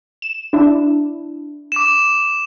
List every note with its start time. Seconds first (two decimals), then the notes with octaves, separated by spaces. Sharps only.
0.22 E7
0.53 D4 E4
1.72 D6 E7